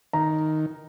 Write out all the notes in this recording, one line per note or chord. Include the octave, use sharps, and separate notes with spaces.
D#3 A#5